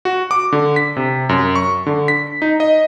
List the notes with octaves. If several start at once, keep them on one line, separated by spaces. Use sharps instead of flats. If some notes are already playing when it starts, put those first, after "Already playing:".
F#4
D6
D3
B6
C3
F#2
C#6
D3
B6
D#4
D#5